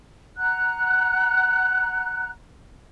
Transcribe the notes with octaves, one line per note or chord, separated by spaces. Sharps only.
F#5 A#5 F#6